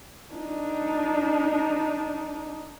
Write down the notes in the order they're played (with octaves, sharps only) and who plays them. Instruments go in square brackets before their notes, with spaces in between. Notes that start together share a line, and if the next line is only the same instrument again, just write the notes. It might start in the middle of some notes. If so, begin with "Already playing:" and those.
[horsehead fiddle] D4 D#4